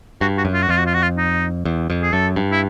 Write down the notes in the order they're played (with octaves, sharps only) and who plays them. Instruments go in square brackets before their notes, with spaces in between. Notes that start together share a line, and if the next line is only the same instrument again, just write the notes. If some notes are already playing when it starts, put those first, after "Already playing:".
[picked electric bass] G2 [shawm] F#4
[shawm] F#4
[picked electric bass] F#2
[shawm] F4
F#4
[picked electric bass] F2 [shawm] F4
[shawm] F#4
F4
F#4
F4
D#4
[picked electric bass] E2
F2
[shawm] G#4
[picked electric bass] F#2 [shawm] A4
[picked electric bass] G2
[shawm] E4